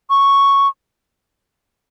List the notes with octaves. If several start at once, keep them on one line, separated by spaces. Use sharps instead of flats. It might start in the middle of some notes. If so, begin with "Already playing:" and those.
C#6